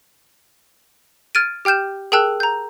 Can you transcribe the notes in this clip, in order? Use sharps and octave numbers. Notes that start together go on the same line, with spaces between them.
F6 G#6 A6 D7 D#7
G4 G5 F6 G6 E7
G#4 A#4 G5 A5 E6 F#6
A#5 G6